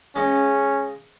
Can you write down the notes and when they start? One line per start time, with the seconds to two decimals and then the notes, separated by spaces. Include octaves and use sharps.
0.16 C#3 G#3 C#4